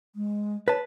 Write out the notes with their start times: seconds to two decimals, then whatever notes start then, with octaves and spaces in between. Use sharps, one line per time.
0.16 G#3
0.68 B4 C#5 A5